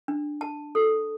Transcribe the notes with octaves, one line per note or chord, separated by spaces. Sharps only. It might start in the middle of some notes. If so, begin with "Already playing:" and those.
D4
A5
A4